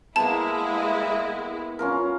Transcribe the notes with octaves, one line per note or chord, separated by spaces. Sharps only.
G#3 A#3 B3 E4 A5
C#4 F4 A#4